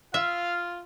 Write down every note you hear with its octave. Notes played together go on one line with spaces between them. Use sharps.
F4 E5 F5